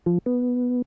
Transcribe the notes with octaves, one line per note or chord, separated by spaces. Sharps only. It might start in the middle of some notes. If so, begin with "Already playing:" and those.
F3
B3